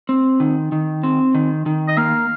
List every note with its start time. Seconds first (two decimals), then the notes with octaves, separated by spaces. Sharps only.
0.09 C4
0.40 D#3
0.72 D#3
1.03 C4
1.35 D#3
1.66 D#3
1.88 D#5
1.97 A#3 F5